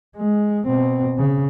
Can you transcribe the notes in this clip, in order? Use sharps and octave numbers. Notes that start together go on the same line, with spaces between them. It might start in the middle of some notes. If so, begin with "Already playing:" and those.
G#3
B2 C4
C#3